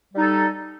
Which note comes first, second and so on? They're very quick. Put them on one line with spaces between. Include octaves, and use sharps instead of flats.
G3 D#4 A4